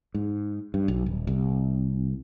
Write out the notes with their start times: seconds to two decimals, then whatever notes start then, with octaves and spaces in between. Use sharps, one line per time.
0.14 G#2
0.74 G2
0.88 B1
1.06 D#1
1.27 C2